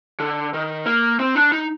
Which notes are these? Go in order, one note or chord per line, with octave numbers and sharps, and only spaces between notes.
D3
D#3
A#3
C4
D4
D#4